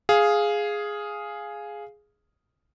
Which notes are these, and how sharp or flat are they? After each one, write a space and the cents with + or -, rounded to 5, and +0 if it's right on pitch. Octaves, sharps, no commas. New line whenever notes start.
G#4 +0 F5 +0